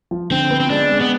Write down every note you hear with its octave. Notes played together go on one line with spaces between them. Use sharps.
F3
D3 C4
B3
C4
G#3 D4
G#3
B3